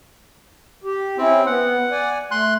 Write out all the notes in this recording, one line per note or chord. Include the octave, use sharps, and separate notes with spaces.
G4
C4 C#4 E4
B3 F#5
D5 G#5
A3 C6 F#6